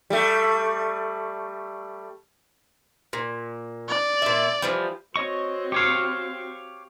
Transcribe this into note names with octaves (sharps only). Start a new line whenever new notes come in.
G3 A3
A#2
D5
A#2 E5
E3 F3 G3
C4 F#4 C#5 D#5 C#6
G4 C#5 F5 C#6